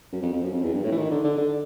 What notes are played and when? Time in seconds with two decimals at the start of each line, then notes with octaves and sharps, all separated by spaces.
0.12 F#2
0.22 F2
0.33 F2
0.42 F#2
0.53 F2
0.63 E2
0.74 G2
0.84 A2
0.92 E3
0.97 D#3
1.11 D3
1.24 D3
1.38 D3